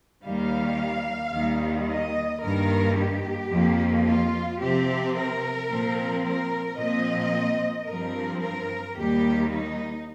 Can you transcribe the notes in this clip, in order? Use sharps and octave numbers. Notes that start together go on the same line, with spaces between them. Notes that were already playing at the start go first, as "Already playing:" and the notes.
D#2 D#3 G3 F5
D#2 D#3 G3
D#5
G2 D#3 A#3 A#4
G4
F2 F3 A#3
F4
C3 F3 C4 G4
A#4
A#2 F3 C4
A#4
A#2 F3 C4 D#5
G2 F3 C4 A#4
A#4
D#2 D#3 G3 A#3 G4
D#4